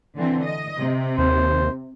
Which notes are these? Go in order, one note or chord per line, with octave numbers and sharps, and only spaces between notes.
D3 E3 C4
D#5
C3
D#2 C5